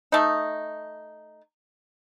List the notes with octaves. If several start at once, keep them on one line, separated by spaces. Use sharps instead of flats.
A3 D#4